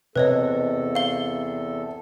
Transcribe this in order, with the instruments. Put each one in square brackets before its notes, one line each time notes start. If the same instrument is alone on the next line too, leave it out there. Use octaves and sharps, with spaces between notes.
[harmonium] E2 A4 [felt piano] C3 [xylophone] B4 C#5 D#5
[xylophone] F5 G7